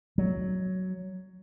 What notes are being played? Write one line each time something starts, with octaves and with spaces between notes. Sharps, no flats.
F#3